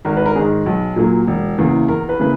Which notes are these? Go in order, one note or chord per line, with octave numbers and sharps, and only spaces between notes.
G#1 A#4
B4
A#4
G#2 D#3 G#4
B1
A#2 F#3 A#3
E1
E2 C#3 E3 A#3
E2 A#4
B4
C#3 E3 A#3 B4